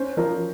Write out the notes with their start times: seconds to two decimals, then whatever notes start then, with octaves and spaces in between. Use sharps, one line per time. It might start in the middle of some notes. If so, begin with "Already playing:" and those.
Already playing: C#4 C5
0.17 F3 A#4